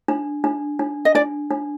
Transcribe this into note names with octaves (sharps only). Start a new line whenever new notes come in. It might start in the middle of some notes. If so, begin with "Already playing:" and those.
D4
D4
D4
D#5
D4 D5
D4